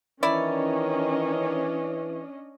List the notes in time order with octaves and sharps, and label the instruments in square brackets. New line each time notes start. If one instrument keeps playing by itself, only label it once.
[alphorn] D#3 [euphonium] E3 [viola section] C#4 D4 D#5 [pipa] E4 D5